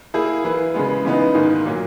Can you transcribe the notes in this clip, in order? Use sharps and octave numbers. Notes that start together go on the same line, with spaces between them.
A#3 E4 G#4
E3 A#3 E4 B4
C#3 G#3 B3
C#3 E3 B3 D#4
G#2 D#3 A#3
A#2 F#3 A#3